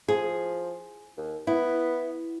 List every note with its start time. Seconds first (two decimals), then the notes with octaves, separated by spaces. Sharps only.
0.08 F3 G#4
1.17 D#2
1.47 B3 E4